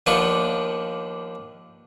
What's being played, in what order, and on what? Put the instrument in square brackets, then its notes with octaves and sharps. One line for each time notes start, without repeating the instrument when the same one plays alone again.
[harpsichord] D#2 F3 B3 D4 C#6